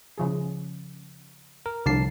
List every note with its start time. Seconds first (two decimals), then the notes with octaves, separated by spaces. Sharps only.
0.18 C#3 F3 G#4
1.66 A#4
1.86 C2 D3 F3 A5 C7